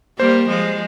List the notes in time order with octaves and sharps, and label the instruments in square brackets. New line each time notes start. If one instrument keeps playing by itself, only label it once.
[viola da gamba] G3 A#3 [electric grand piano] C5
[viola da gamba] F3 G#3